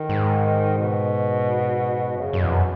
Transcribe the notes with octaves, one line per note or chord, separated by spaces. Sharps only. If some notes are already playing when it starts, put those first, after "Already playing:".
Already playing: D#3
G#2
B2
F#2 C#3
F#2
E2 B2
F#2